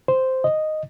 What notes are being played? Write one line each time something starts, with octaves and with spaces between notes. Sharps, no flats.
C5
D#5